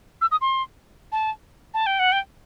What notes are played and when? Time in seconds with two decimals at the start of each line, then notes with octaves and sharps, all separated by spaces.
0.21 E6
0.31 D#6
0.41 C6
1.12 A5
1.74 A5
1.86 G5
1.99 F#5
2.12 G5